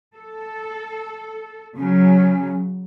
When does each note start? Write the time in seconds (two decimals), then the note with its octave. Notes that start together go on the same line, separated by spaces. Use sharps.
0.16 A4
1.77 C#3 F#3 C#4